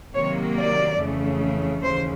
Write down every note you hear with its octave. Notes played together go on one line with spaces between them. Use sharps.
C3 D#3 F#3 A#3 C#5
D5
F2 C#3 E3 A3
D#2 C#3 E3 C5